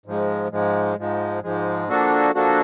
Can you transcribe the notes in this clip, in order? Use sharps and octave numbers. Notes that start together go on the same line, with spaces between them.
G#2 F3 G#3
G#2 F3 G#3
G#2 F3 G#3
G#2 F3 G#3
F3 A#3 D4 F#4 A4
F3 A#3 D4 F#4 A4